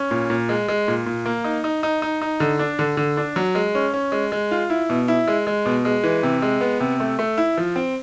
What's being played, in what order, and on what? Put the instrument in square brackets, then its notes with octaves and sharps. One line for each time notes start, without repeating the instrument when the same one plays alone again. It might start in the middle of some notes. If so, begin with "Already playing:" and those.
Already playing: [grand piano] C#4
A#2
A#2
G#3
G#3
A#2
A#2
A#3
D#4
D#4
D#4
D#4
D#4
D3
D4
D3
D3
D4
F#3
G#3
C#4
C#4
G#3
G#3
F4
E4
B2
E4
G#3
G#3
B2
G#3
E3
C3
G#3
B3
C3
A3
A3
E4
F3
C4